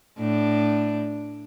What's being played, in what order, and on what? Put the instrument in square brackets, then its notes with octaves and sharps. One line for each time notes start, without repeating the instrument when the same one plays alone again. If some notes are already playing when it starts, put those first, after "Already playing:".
[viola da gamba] A2 D4